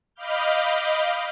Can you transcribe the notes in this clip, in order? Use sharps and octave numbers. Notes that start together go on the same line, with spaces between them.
D#5 F5 B5 D6 F6 G6